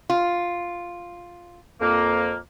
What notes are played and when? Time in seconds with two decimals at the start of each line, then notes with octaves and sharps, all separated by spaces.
0.10 F4
1.81 F2 A#3